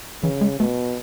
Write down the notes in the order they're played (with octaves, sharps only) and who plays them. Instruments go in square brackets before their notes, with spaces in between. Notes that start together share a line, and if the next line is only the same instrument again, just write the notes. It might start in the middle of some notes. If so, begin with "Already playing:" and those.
[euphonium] C#3 [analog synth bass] E3
[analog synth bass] G#3
[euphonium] B2 [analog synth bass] A3